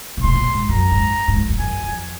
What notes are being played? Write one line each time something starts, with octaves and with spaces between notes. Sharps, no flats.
C3
A#2 C6
G#2
A#2
G#2
F#2 A#5
G#2
G#2
F#2
F2
F#2 G#5
F2